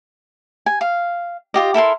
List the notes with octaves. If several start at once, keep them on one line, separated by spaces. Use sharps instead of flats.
G#5
F5
F4 G4 D#5
E4 A4 A#4 C6